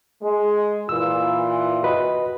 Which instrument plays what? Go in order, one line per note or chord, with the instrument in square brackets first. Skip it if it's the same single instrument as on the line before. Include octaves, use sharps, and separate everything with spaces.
[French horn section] G#3
[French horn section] A#2 E3 F4 [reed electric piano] E6
[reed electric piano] F#4 B4 D#5